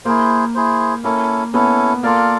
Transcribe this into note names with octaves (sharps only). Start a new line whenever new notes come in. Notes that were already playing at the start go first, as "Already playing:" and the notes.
A#3 E4 G#4 C5
E4 G#4 C5
A#3 C#4 E4 A4
B3 C#4 E4 A4
A#3 F4 A4 D5 F5